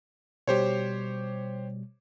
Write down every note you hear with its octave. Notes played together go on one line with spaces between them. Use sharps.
B2 G3 G4 C5 C#5